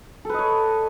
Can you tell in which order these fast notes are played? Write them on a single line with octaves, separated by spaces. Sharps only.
A4 B4 D#5 C#5